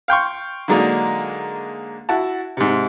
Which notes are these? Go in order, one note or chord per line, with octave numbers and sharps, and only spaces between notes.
F5 G5 C6 C#6
D3 F#3 G#3 A#3 D4 D#4
E4 F#4 A5
G#2 C3